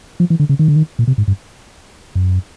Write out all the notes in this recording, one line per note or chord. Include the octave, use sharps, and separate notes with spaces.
F3
E3
D3
C#3
D#3
D3
D#3
A#2
C3
G#2
G2
F#2